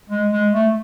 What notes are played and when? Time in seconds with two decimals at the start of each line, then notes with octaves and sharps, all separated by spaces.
0.09 G#3
0.31 G#3
0.53 A3